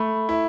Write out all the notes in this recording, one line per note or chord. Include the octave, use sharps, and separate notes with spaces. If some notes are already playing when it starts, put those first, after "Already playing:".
Already playing: A3 B5
E4